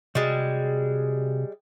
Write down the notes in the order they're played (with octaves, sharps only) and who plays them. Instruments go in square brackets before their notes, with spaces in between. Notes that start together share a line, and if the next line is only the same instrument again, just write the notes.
[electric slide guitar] C3 F#4 G#4 [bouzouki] G3 G#3